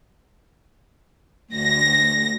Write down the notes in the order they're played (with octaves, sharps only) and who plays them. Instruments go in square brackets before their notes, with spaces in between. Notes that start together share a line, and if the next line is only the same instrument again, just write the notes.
[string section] D2 A#6